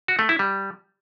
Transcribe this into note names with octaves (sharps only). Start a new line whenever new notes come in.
F#4
A3
E4
G3